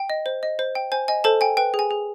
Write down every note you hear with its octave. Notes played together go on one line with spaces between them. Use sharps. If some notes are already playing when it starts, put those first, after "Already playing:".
Already playing: G5
D#5
C5
D#5
C5
G5
C5 G#5
D#5 G#5
A4 C5 A5
G5 G#5
B4 G5
G#4
G#5
G#4